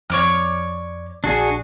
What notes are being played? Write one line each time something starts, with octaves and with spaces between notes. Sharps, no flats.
F2 C#5 D5 F6
A#1 D4 F#4 G#4